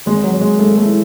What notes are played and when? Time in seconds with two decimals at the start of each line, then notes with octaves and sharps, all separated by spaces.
0.06 G#1 G#3
0.24 F#3
0.33 G#1
0.41 G#3
0.59 G#2 A3
0.77 A3
0.85 E3